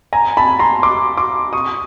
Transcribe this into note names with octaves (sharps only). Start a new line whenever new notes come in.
G#5 A#5
A5 B5
A#5 C6
C6 D6
C6 D6
C#6 D#6